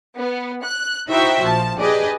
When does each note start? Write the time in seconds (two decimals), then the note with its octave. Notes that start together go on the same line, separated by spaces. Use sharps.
0.17 B3
0.64 F#6
1.09 D#4 E4 F#4 C5 E5 G5
1.43 A#1 F3 A5
1.80 D4 G4 G#4 B4 D5 D#5